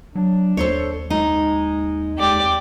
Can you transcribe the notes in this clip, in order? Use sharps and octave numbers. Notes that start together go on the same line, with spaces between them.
F#3 D4
D#2 A4 C5 C#5
G#3 D#4
F2 G#3 G4 D5